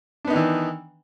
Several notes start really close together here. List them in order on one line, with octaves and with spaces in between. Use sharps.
D4 B3 D#4 D#3 E3